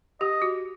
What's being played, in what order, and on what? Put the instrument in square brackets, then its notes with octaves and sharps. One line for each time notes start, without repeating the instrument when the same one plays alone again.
[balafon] G4 [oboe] D#5
[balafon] F#4